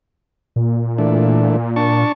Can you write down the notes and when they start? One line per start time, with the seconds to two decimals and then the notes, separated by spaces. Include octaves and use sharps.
0.56 A#2
0.98 E3 A3 D4
1.76 D4 A5 C#6